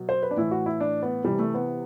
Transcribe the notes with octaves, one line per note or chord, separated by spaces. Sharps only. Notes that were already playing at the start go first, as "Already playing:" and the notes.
Already playing: B2 F#3
C5
B4
D4
A2 E3 E4
F#4
E4
D4
B3
C3 E3 G3
A3
B3